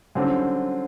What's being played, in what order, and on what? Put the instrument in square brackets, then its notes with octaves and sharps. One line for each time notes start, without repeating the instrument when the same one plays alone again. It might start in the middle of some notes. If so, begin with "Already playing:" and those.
[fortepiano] F#2 D3 G3 C4